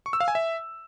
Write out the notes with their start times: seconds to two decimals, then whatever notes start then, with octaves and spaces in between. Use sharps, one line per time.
0.06 C#6
0.13 E6
0.20 F5
0.28 G#5
0.35 E5